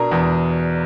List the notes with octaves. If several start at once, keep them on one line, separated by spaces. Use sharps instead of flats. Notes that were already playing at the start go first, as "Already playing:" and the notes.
Already playing: B2 D4 A#4
E2